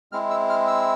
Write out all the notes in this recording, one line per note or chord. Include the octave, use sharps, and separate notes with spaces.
G#3 C4 E4 F6
E6
F6
E6